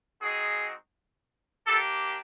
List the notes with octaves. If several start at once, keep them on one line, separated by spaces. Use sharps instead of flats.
G#3 C4 D#4 F#4 G#4
A#3 D4 G4 A4